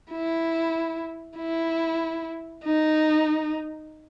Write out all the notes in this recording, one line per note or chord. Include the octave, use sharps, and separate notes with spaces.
E4
E4
D#4